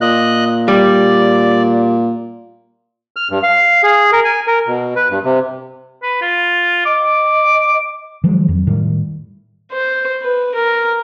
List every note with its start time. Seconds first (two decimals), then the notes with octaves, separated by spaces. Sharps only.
0.01 A#2 D#5 F#6
0.68 G3 D5
3.16 F6
3.30 G2
3.43 F5
3.83 G#4
4.12 A#4
4.25 G#5
4.47 A#4
4.67 B2
4.96 B4
5.10 G2
5.25 C3
6.02 B4
6.21 F4
6.86 D#5 D6
8.24 D#3 F3 F#3 G#3
8.48 F2 F#3
8.67 A2 D#3 G3
9.72 C5
10.22 B4
10.55 A#4